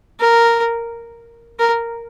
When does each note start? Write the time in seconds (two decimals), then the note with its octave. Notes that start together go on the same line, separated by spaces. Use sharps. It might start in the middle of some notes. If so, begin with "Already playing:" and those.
0.20 A#4
1.60 A#4